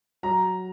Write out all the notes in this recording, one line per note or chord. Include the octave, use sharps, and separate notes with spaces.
F#3 A#5